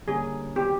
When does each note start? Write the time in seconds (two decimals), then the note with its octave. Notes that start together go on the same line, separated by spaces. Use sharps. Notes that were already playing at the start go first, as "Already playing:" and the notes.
0.08 D3 G3 A#3 C#4 G#4
0.56 D#3 F#3 B3 G4